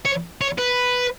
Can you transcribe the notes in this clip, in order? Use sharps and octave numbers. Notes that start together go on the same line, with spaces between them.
C#5
C#5
B4